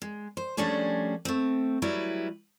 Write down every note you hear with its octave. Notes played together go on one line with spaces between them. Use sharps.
G#3
C5
F3 G3 A3 C#4 D4 G#4
A3 C4
F#3 G3 E4 B4